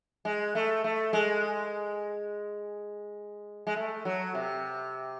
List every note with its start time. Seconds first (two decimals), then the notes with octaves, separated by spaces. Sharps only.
0.25 G#3
0.55 A3
0.84 A3
1.13 G#3
3.67 G#3
3.76 A3
4.05 F#3
4.35 C3